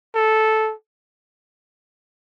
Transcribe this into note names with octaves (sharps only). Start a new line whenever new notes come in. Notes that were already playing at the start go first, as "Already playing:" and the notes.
A4